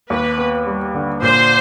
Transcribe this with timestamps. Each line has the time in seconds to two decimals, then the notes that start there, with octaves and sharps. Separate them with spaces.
0.10 D#2 B4
0.38 B3
0.67 G3
0.94 D3
1.22 A#2 C5